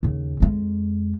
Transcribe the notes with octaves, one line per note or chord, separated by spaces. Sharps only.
D#2 C#3
F2 G#3